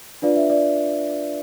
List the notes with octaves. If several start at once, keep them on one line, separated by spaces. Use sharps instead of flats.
D4 F4 B4 D5 F5
E5
D5